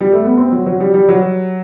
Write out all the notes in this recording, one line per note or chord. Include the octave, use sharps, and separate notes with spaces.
G3
A3
B3
C4
F#3
F#3
G3
G3
F#3